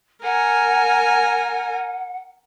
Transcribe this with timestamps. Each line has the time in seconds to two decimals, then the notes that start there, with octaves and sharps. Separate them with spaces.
0.23 A#4 F#5 G#5